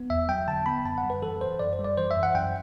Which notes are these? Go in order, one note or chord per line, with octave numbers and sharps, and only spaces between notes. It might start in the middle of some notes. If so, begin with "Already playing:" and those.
Already playing: B3
E2 E5
F#3 G5
D3 A5
B3 B5
F#2 A5
F#5
G3
B4
E3 A4
F#2 C5
F#2 D5
C5
G3
D5
E3 C5
E5
F#2
F#5
F#2 G5